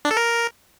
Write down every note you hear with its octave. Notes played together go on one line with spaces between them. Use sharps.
D4
A4
A#4